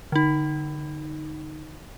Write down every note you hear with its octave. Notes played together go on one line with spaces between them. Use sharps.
D3 D#4